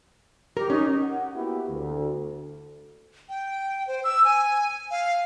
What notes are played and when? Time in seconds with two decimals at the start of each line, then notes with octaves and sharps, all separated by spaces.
0.57 G4 A#4
0.70 C#4 D#4
1.02 F#5
1.34 A#3 B3 E4 F#4 G4
1.68 D2
3.29 G5
3.88 C5
4.04 E6
4.25 G#5
4.91 F5